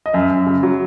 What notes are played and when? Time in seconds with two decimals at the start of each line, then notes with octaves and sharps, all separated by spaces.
0.06 D#5
0.13 F#2 E5
0.30 F#2
0.46 C#3
0.63 F#3